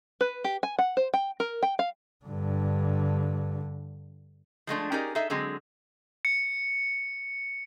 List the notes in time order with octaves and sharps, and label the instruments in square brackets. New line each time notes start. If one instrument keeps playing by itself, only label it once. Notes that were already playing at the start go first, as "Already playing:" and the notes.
[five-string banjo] B4
G4
G#5
F#5
C5
G5
A#4
G5
F5
[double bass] G2 D3
[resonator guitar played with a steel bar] F3 G#3 A3 D4
C#4 D#4 G4 G#4 A#4 D5
D#4 G#4 A4 E5
D3 F#3 G#3 C4
[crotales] C#7